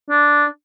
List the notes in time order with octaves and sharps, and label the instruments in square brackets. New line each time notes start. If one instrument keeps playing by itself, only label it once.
[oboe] D4